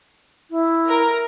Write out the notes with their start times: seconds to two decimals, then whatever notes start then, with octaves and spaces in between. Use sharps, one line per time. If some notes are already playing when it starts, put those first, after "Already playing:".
0.51 E4
0.88 A#4